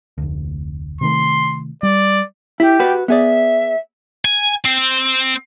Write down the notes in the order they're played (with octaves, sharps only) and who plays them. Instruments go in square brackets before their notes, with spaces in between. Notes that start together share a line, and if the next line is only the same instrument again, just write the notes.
[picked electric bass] F1 D2
[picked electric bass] C3 D#3 A3 [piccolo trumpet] C6
[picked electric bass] G3 [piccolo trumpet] D5
[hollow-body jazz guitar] E4 [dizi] G4
[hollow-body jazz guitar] F#4 B4
[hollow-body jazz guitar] B3 G#4 D5 [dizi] E5
[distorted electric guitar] G#5
C4